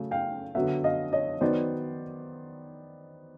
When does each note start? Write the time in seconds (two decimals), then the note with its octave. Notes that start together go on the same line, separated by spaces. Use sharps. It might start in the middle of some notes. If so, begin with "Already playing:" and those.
Already playing: C#3 F#3 A3
0.11 F5 G5
0.55 D3 F#3 B3 E5 F#5
0.84 D#5 F5
1.13 C#5 D#5
1.41 D#3 F#3 B3 C5 D5